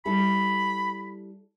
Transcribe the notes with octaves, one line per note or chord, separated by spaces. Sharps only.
G3 E4 A4 B5